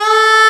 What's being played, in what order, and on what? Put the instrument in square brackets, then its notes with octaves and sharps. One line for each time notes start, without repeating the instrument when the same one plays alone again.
[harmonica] A4